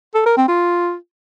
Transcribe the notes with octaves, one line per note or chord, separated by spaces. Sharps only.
A4
A#4
C4
F4